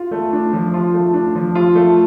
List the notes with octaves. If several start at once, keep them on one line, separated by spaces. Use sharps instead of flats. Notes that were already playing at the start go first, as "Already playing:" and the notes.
Already playing: F4
A3
D4
F3
F4
A3
D4
F3
F4
A3